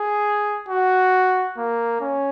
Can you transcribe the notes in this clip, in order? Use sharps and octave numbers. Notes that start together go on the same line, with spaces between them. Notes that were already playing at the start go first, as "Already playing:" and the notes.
Already playing: G#4
F#4
A#3
C#4